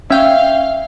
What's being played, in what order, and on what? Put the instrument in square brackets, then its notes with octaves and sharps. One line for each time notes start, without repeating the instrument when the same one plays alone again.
[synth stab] C#4 G5 [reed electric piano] E5 [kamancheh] F5